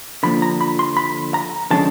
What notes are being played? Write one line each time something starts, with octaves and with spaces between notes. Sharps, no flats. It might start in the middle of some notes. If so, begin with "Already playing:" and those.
D3 F3 A#3 B5
A#5
B5
C6
B5
A#5
D3 F3 G#3 C#4 A5